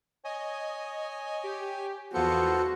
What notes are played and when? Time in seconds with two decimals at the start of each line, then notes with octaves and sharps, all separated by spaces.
0.25 C#5 D#5 G#5
1.43 G4
2.14 E2 B3 F4 F#4 A4 C5 C#7